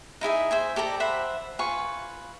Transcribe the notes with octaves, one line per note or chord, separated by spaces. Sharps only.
D#4 E4 G#4 E5
C5 E5 G#5
G4 A4 D5 A#5
C5 E5 F#5 B5
F4 B4 G#5 C#6